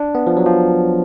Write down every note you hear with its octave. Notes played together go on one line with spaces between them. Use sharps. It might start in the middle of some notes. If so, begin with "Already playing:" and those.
Already playing: D4
B3
F3
F#3
F3